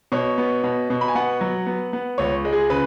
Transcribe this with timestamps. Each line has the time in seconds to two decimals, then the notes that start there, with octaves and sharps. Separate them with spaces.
0.12 B2 C#5
0.38 B3
0.64 B2
0.90 B2
1.01 B5
1.08 G#5
1.15 B3 F#5
1.41 F#3
1.67 B3
1.93 B3
2.18 C#2 C#5
2.45 G#3
2.53 G#4
2.70 C#3 B4